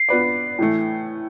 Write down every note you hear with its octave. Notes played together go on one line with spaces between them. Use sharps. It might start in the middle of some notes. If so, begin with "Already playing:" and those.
Already playing: C7
B3 F4 B4 D5
A2 E3 A3